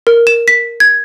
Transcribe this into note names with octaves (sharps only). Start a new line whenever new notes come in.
A#4
E7
B6
G#6